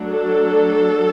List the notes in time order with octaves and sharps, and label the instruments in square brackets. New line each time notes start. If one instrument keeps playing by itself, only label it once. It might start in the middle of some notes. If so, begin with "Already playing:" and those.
Already playing: [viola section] F#3 A3 D4
A4